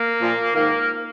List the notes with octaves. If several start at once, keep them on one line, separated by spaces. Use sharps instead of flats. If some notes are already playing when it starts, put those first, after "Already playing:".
Already playing: A#3
A#2 F3
G#2 D#3 A#3